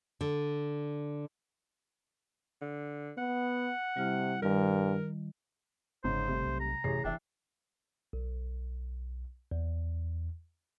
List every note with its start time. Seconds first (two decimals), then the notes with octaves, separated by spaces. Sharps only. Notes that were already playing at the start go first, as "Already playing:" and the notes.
0.21 D3
2.61 D3
3.18 B3 F#5
3.97 C3 G3 E4 F6
4.42 G2 D#3 G3 A#4
6.04 G1 G#2 C#3 C5
6.28 C3 G3 A3
6.46 B1
6.60 A#5
6.84 A1 C3 G#4 C7
7.04 F1 E3 D4 E5 G5
8.13 B1
9.51 E2